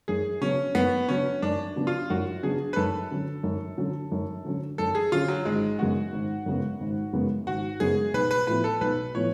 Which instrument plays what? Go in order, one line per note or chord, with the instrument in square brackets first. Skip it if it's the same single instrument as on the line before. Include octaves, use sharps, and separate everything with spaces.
[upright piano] F#2 [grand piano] G#4
[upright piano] C#3 F#3 B3 D4 [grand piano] C#4
[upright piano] F#2 [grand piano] B3
[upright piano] C#3 F#3 B3 D4 [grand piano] C#4
[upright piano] F#2 [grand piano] D4
[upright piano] C#3 F#3 B3 D4
[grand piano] F4
[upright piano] F#2 [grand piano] F#4
[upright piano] C#3 F#3 B3 D4 [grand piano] G#4
[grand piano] B4
[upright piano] F#2 [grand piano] A4
[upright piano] D3 F#3 C#4
F#2
D3 F#3 C#4
F#2
D3 F#3 C#4
[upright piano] F#2 [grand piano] A4
[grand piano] G#4
[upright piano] D3 F#3 C#4 [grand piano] F4
[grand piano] F#3
[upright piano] G#1 [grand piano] G#3
[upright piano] F#2 C#3 G#3 B3 [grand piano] F#4
[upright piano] G#1
F#2 C#3 G#3 B3
G#1
F#2 C#3 G#3 B3
[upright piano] G#1 [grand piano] F#4
[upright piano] F#2 C#3 G#3 B3 [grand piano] G#4
[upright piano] B1 [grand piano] B4
[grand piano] B4
[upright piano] A2 F3 B3 [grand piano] B4
[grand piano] A4
[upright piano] B1 [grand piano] B4
[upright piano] A2 F3 B3 [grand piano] C#5